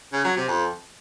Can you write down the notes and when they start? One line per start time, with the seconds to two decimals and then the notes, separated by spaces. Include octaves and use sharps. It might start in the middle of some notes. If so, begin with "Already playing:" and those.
0.12 C#3
0.24 F#3
0.36 C3
0.48 F2